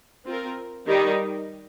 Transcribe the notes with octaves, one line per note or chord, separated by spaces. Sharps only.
C4 F4 A#4
D#3 G3 D#4 G4